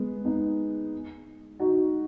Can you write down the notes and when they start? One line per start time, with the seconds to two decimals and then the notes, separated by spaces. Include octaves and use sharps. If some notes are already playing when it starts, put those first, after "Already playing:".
Already playing: G#3 B3
0.25 B3 D#4
1.60 D#4 F#4